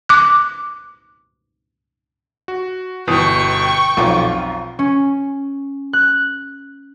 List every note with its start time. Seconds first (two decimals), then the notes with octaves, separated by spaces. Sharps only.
0.09 D6 F#6
2.48 F#4
3.07 G1 B2 E3 G5 C#6 D#6
3.97 B1 F2 F4 D6
4.79 C#4
5.93 F#6